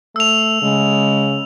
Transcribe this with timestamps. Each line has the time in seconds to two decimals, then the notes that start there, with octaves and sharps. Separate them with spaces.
0.16 A3 E6 F7
0.62 C#3 G#3